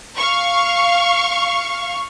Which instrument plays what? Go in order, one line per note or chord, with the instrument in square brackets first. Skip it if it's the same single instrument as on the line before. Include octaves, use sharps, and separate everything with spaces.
[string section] F5 C#6